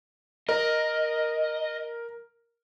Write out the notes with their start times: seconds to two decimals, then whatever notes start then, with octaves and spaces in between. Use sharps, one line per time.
0.49 A#4 D#5